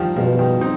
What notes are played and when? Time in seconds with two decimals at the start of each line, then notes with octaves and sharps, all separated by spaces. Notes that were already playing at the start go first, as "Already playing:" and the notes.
Already playing: D#3 F3 G3
0.16 B2 F3 G#3
0.38 D#3 G3
0.61 C4 D#4